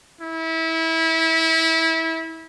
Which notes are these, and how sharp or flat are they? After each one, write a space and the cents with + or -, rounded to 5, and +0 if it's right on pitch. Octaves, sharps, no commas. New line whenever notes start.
E4 -25